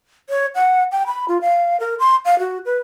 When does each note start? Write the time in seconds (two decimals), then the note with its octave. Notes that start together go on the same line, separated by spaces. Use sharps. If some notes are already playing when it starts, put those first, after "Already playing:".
0.30 C#5
0.55 F#5
0.92 G5
1.07 B5
1.28 F4
1.41 F5
1.80 A#4
1.99 C6
2.25 F5
2.39 F#4
2.66 B4